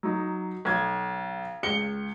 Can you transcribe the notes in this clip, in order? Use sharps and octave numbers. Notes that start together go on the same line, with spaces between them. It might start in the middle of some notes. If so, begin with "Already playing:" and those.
F#3 D#4
B1 G#6
C#2 C#7 G7